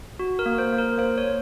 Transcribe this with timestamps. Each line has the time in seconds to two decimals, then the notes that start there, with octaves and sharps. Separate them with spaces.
0.19 F#4
0.39 A#4
0.46 A#3
0.58 C5
0.72 A#3
0.78 A#4
0.98 A#3 C5
1.18 C#5
1.24 A#3